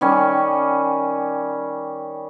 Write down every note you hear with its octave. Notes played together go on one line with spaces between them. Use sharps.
D#3 G3 C#4